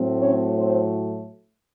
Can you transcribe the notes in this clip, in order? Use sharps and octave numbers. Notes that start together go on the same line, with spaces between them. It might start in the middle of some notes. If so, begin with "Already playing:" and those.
Already playing: A2 F#3 A3 C4
C#4 C#5
C4 C5